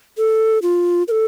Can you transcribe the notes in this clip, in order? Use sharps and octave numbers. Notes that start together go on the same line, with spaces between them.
A4
F4
A#4
A4